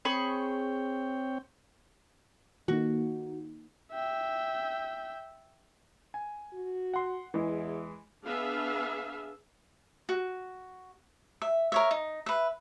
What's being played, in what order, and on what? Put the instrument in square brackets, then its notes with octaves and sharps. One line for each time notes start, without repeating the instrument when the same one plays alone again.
[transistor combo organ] C4 C#5 G5 [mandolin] G#4 B5 C#6
[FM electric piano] D#3 A#3 D#4 [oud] F#4
[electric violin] E5 G5
[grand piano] G#5
[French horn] F#4
[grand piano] F#5 C6
[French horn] E2 [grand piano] E3 G#3
[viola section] B3 D4 G#4 B4 E5 F5
[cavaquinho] F#4
E5
A#4 C#5 E5
D#4
B4 E5